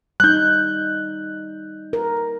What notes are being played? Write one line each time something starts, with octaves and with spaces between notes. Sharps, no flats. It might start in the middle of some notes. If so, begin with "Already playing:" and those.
G3 D#4 F#6 G6
A#4